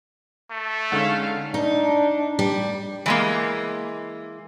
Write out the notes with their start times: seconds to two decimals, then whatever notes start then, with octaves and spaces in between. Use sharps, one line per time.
0.50 A3
0.92 D3 G#3 C#4 D#4 F5 F#5
1.54 D4 D#4
2.39 G3
3.06 E3 G#3 A#3